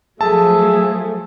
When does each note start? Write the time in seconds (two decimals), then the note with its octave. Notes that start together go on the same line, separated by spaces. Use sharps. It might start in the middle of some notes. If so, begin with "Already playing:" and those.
0.21 F3 F#3 A3 G#4 E5 A5